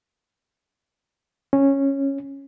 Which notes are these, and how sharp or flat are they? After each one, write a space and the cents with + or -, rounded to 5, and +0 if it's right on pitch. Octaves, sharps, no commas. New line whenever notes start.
C#4 -10